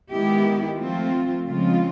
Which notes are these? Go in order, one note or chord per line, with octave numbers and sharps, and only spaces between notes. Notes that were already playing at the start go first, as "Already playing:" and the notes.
D#3 G#3 B3 E4 G4
F3 A3 C4 F4
C#3 F3 G#3 C4 F4